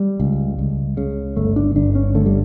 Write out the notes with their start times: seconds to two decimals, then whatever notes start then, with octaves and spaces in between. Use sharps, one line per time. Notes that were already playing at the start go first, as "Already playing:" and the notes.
Already playing: G3
0.20 C#2
0.59 C#2
0.97 C#3
1.37 G1 A3
1.56 D4
1.76 G1 D4
1.95 C#4
2.15 D3 A3
2.26 G3